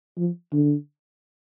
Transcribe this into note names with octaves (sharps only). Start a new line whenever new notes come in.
F3
D3